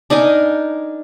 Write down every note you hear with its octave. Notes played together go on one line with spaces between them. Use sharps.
D4 D#4 A#4 G#5